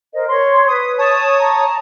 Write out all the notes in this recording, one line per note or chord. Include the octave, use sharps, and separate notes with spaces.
A#4 C5 D#5
C#5 C6
B4 D#6
C#5 A5 D#6
A5 A#5